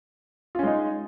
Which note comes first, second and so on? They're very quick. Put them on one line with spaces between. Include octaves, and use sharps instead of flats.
F4 C#4 G#3 D#4